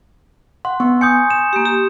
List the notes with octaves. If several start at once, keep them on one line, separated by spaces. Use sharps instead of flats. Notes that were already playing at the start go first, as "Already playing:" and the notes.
F#5 C6
B3 C#6
G#5 D#6 G6 C#7
E7
A#3 G4
G4